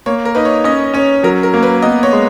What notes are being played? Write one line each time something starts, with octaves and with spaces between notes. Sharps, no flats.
A#3 C#5
A#4
D#4 B4
C#5
C#4 D#5
C#4 C#5
F#3 A#4
A#4
A#3
B4
B3 D#5
C#5
G#3